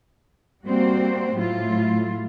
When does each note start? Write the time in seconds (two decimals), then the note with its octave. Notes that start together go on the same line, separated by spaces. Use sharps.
0.64 G3 A#3 C4 F#4 C5
1.35 A2 F#3 A3 E4 F4